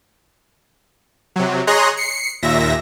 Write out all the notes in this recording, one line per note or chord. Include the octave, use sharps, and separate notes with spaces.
C3 F#3
G#4 C#5 D#5 A#5 C6 F#6
C7 C#7
D#2 A#2 E5 A#6